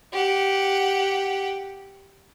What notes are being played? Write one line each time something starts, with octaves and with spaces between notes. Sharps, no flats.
G4 F#5